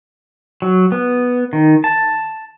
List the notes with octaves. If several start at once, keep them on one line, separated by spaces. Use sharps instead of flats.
F#3
B3
D#3
A5